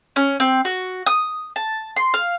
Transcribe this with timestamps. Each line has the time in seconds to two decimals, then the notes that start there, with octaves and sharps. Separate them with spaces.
0.16 C#4
0.40 C4
0.65 F#4
1.06 D#6
1.56 A5
1.96 C6
2.14 F5